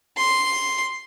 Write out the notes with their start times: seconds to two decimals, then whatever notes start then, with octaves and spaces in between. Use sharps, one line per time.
0.18 C6